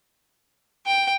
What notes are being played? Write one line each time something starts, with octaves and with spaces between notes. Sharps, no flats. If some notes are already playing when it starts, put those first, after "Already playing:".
G5